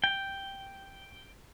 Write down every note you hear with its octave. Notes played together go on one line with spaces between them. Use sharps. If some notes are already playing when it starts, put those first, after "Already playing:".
G5